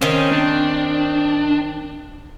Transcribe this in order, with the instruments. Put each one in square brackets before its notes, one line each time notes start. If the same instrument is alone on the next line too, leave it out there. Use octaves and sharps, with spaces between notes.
[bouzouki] D#3 C4 [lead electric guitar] C#4
[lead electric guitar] D4